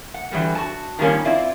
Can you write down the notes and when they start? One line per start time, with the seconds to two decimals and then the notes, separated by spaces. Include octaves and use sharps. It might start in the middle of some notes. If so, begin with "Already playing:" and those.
0.14 F#5
0.31 D3 E3 F#3 G3 A#3
0.55 F#4 A5
0.99 D#3 F3 G3 A#3 C#4
1.25 C4 E4 F4 D5